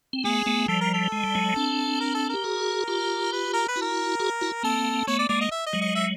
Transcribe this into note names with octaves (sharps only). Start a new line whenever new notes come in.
C4
A3 B3 G#4
A3 B3
F3 G3 A4
A#4
A4
G#3
G3
F#3 G#3
C4 D4
A#4
A4
G4 A#4
F#4 G#4
F4 G4
B4
A#4
B4
E4 F#4
A#4
F#4 G#4
E4 F#4
A#3 C4 A4
A3 B3 C#5
D5
G#3 A#3 D5
D#5
E5
D#5
F#3 G#3
D#5
E5